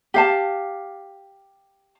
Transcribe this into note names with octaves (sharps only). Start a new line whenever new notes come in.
G4 F5 A5